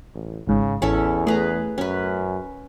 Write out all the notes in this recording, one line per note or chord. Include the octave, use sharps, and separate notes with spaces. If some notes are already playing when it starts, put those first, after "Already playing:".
A1
G#1 G#2 C#3
A1 E2 C#4 E4 A4
A3 G#4 B4 A#5
F#2 C#4 B4